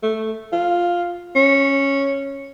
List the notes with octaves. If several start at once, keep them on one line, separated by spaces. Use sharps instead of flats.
A3
F4
C#4